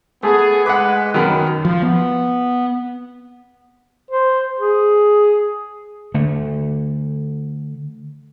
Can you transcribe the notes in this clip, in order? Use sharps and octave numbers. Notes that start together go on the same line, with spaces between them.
A3 B3 G#4
G#3 B4 F#5 D6
F#2 B2 D#3
F3
B3
C5
G#4
D3 A3